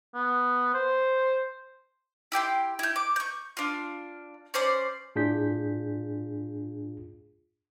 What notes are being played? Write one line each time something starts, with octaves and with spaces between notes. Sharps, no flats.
B3
C5
E4 G4 G5 C6
E4 G6
D6
C#6 G6
D4 F4
C#4 C5 D5 C6
A2 D4 F4 G#4 G6 B6